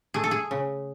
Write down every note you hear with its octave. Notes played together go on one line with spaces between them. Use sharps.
A3 G#4
A4
G#4
C#3